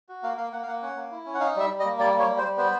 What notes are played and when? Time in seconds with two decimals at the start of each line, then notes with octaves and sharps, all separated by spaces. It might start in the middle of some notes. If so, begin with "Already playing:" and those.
0.09 F#4
0.23 A#3 F5
0.37 A#3 F5
0.53 A#3 F#5
0.63 F5
0.67 A#3 F#5
0.82 C#4 F#5
0.96 A#3
1.12 E4
1.26 C#4
1.35 F#5
1.40 D#4 F5
1.56 G3 E5
1.70 G3
1.80 D#5
1.85 A#3
1.99 G3 D5
2.14 A#3
2.19 C#5
2.29 G3
2.38 C5
2.43 G3
2.58 B3 C5